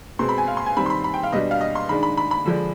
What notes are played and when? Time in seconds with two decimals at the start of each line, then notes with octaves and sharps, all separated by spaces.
0.19 B2 G#3 C4 C6
0.29 B5
0.38 G#5
0.48 F5
0.57 C6
0.66 G#5
0.77 D#3 G3 C4 B5
0.86 C6
0.90 B5
1.04 B5
1.14 G5
1.23 F5
1.33 B2 G3 D4 D#5
1.51 F5
1.61 D#5
1.75 C6
1.89 D#3 G#3 D4 B5
2.03 B5
2.18 B5
2.31 B5
2.46 D3 F3 G#3 D4